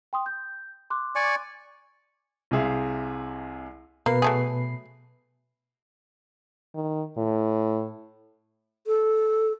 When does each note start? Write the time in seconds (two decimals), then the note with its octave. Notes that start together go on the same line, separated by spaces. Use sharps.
0.13 G5 C6 D#6
0.26 G6
0.90 C6 D6 F#6
1.15 D5 G#5 C#6
2.51 C2 C3 G#4 E5 F5
4.06 B2 A#3 B4 C7
4.22 F#3 A3 G#4
6.75 D#3
7.17 A2
8.87 A4